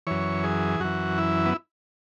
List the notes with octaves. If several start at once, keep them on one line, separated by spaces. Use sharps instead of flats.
F#2 E3 C#5
G#4
F#2 E3 F#4
E4
B3